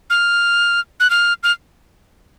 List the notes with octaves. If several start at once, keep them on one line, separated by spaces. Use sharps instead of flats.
F6
F#6
F6
F6